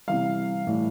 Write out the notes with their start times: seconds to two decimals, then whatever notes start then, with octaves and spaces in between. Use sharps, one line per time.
0.07 C3 E3 G3 F5
0.67 A2 E3 G3